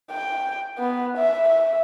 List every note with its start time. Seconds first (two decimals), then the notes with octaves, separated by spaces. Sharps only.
0.11 G5
0.78 B3
1.17 E5
1.48 E5